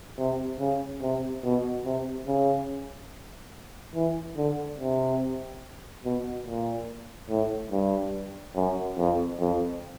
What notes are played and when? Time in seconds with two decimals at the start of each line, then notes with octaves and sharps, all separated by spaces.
0.18 C3
0.59 C#3
1.01 C3
1.44 B2
1.85 C3
2.27 C#3
3.94 E3
4.37 D3
4.78 C3
6.04 B2
6.46 A#2
7.30 A2
7.71 G2
8.55 F#2
8.97 F2
9.40 F2